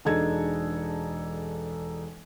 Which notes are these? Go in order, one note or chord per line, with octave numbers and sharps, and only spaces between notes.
E1 D4 D#4 G#4 A4 G#6